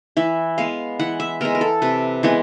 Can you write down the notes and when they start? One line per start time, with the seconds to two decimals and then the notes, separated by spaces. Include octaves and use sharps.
0.17 E3 E5
0.58 G#3 B3 F5
0.99 E3 F#5
1.20 E5
1.41 G#3 B3 A#4
1.55 A#4
1.61 A4
1.82 C3 B4
2.23 E3 G#3 B3